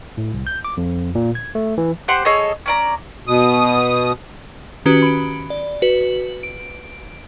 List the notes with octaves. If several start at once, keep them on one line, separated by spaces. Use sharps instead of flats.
A2
C2
G6
D6
F2
A#2
G#6
A3
E3
G4 C5 F#5 C6
G#4 A4 C#5 D#5
C#4 D5 A#5
B2 D#6
D#3 C#4 F#4 G4 B4
B5 D7
D5
F#4 B4
D7